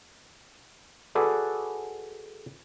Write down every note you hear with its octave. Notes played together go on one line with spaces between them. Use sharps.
F#4 G#4 A4 B4 D5